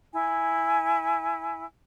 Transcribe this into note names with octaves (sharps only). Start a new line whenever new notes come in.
E4 G#5